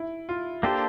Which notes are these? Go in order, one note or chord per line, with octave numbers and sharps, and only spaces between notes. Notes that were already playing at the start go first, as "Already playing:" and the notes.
Already playing: E4
F4
A#3 D4 G4 A4 C5